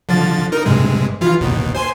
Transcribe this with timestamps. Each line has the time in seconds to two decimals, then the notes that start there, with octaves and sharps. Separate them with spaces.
0.09 D3 F3 A6
0.52 D#4 A#4
0.66 G2 C3 G#3
1.21 E3 F4
1.41 D#2 B2
1.75 C5 G#5 C6